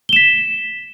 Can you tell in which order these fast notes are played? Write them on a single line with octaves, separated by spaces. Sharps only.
G7 E7 B6